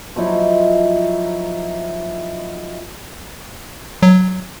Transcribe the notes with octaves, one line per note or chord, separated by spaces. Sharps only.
F3 F#3 D#4 E4
F#3